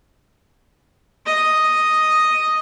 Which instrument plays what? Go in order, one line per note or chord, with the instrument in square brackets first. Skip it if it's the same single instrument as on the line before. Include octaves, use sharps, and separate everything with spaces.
[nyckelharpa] D#5